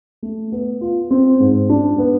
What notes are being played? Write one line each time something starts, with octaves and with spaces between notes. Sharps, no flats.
A3
B3
F4
C4
G#2
D4
B3